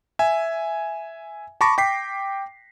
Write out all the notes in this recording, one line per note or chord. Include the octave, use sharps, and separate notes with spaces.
E5 G#5
A5 B5 C#6 D6 A#6
G5 D6 B6 C7